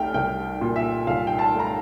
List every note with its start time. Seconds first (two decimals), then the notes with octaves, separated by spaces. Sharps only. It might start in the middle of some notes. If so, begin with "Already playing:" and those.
Already playing: C2 A3 G5 F6
0.14 C2 G5
0.61 A#2
0.76 E5
1.07 C2 F5
1.27 G5
1.39 A5
1.54 A3
1.59 A#5